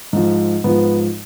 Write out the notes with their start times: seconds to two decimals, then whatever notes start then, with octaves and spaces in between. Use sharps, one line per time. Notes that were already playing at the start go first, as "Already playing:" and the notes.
0.13 G#2 F3
0.64 G#2 F3 B3